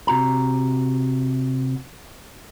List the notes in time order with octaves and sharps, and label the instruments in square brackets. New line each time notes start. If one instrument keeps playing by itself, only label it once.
[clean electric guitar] C3 F#4 A#5